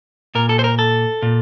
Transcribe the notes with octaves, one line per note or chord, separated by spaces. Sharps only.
A#2 A#4
A4
C5
A#4
A4
A#2